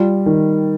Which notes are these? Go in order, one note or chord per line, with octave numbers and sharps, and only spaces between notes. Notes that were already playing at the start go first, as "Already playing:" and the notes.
Already playing: G3 F4
D#3